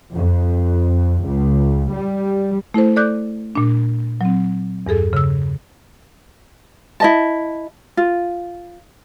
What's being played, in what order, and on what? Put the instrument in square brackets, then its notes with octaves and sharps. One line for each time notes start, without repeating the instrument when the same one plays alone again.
[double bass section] F2
C#2
G3
[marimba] A3 E4 A4 C5
A4 D5 D6 F#6 G6
A#2 D4
F#3 C4
E2 G2 G#4 A4
C#3 E6
[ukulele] E4 D#5 A5
F4